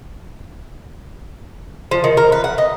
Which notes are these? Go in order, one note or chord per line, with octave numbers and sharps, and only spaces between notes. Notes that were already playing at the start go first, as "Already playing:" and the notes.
F3
D#3
A#4
B4
F#5
D#5